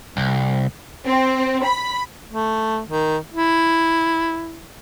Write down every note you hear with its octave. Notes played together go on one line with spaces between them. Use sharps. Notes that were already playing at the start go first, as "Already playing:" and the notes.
C2
C4
B5
A3
D#3
E4